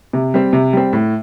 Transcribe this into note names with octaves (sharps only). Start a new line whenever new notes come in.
C3
G3 C4
C3
G3 C4
A2